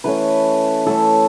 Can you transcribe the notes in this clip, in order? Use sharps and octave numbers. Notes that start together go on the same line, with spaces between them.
E3 A3 C#4 B4
E3 A3 C#4 A4